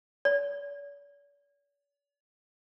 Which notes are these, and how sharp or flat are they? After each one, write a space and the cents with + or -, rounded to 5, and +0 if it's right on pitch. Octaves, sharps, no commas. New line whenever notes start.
D5 -45